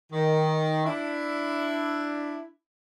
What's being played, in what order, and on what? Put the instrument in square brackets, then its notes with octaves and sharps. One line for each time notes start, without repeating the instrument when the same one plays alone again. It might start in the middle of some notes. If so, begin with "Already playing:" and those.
[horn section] D#3
D4 E4